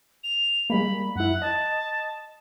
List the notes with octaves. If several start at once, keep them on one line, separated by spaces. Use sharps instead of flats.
F7
G3 G#3 A#3 B5
F#2 E4 F#5
D#5 A5